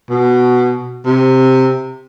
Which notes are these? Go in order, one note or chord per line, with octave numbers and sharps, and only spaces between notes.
B2
C3